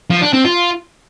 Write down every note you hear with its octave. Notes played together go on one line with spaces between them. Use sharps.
F3
D4
C4
F4